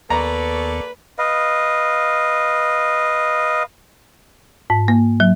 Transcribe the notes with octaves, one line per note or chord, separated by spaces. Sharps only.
D#2 A#3 B3 A4 B4 D5 A#5 C#6
B4 D#5 F5
G#2
A#3
F#3